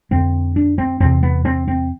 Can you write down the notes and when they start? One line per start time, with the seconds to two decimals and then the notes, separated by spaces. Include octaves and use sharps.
0.11 F2 D3 C4
0.56 D4
0.78 C4
1.00 E2 C3 C4
1.23 B3
1.45 C4
1.68 C4